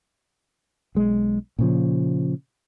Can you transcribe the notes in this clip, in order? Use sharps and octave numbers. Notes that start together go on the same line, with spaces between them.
B1 G#3
A#2 C#3 F3